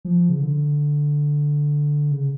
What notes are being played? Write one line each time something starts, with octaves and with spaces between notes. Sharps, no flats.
F3
C#3
D3
C#3